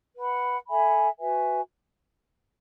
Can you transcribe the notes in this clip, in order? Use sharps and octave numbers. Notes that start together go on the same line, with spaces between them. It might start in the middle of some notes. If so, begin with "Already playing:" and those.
B4 F#5 B5
A4 E5 G#5 B5
F#4 B4 E5 G#5